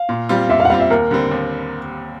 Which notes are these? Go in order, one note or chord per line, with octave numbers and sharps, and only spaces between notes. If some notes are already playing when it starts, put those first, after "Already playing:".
Already playing: F5
A#2
G3 C4 F4
A#2 E5
F5
F#5
G3 C4 F4 F5
E5
D#2 A#4
D3 G3 C4
D#2